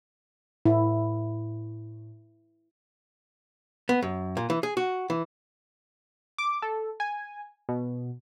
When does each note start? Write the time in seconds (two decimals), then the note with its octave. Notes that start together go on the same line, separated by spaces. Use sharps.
0.65 A2 E4
3.89 B3
4.02 F#2
4.37 A#2
4.50 E3
4.63 G#4
4.77 F#4
5.10 E3
6.38 D6
6.62 A4
7.00 G#5
7.69 B2